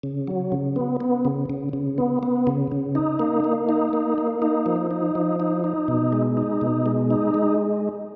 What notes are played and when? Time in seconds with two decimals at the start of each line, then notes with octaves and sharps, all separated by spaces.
0.03 C#3
0.27 F#3
0.52 C#3
0.76 B3
1.00 B3
1.25 C#3
1.50 C#3
1.73 C#3
1.98 B3
2.23 B3
2.47 C#3
2.72 C#3
2.95 D#4
3.19 A#3
3.44 A#3
3.69 D#4
3.93 A#3
4.18 A#3
4.42 D#4
4.66 F3
4.91 D#4
5.15 F3
5.40 D#4
5.64 D#4
5.88 B2
6.13 G#3
6.37 D#4
6.61 B2
6.86 G#3
7.10 D#4
7.34 G#3